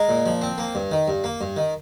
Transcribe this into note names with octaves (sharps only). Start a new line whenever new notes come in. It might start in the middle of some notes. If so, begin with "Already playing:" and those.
Already playing: G#3 A#4
A#2
F3
C4
A#3
G2
D#3
G2
A#3
G2
D#3